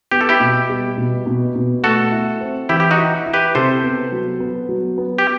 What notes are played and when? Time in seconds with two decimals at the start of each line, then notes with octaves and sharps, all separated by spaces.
0.12 B3 G4
0.21 A4
0.29 E4 G4
0.40 B2
0.69 G3
0.97 B2
1.26 B2
1.55 B2
1.83 A3 F#4 A4
2.12 E4
2.41 C4
2.69 E3 E4 G4
2.80 G4
2.91 D#4 F#4
2.97 E4
3.26 E4
3.34 G4 B4
3.55 C3 A4 C5
3.83 B3
4.12 F#3
4.40 B3
4.69 F#3
4.98 B3
5.18 G4